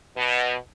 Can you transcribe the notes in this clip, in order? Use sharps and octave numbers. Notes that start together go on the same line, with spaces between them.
B2